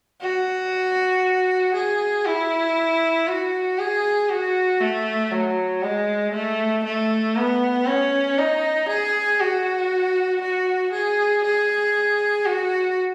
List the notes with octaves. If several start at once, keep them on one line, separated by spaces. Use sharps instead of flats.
F#4
G#4
E4
F#4
G#4
F#4
A3
F#3
G#3
A3
A3
B3
C#4
D#4
G#4
F#4
F#4
G#4
G#4
F#4